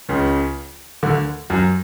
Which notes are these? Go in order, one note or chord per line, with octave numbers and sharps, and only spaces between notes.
C#2 C#3
D2 D3
F#2 F#3